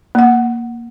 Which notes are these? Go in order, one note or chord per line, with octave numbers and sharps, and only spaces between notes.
A#3 F#5